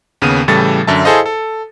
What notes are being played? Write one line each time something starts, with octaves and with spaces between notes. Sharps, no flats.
D#2 C#3 B3 D#7
A2 C#3 E3 G3 A4 A6
F#2 D3 E5 A5
E4 G#4 A4 C5 D#5 F5
A4